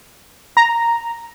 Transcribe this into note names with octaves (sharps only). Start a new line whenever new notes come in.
A#5